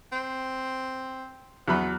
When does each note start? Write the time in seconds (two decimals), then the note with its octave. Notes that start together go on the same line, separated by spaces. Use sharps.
0.12 C4
1.68 E2 F#3 B3 B5